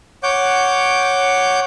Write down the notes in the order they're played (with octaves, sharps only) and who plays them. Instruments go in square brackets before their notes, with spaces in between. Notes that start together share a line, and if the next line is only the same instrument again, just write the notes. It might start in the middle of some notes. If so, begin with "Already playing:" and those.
[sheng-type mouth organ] C#5 F#5 D6 G6